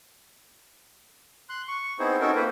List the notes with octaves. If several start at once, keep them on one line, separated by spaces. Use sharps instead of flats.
C6 F#6
C#6
B3 C4 D#4 E4 G#4 C5
C4 C#4 D#4 F#4 A4 A#4
A#3 F4 B4 C5